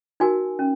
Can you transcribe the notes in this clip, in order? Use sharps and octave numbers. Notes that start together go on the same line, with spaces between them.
D#4 F#4 A#4 G#5
C#4